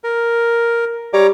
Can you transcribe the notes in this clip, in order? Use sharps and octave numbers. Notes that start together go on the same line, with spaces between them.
A#4
G3 C#5 A#5 D6